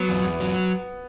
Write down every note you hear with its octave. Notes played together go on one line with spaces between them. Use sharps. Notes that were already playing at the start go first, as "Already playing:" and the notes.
Already playing: F#3 B3
E2
E2
F#3